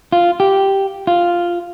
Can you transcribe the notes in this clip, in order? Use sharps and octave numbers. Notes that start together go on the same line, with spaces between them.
F4
G4
F4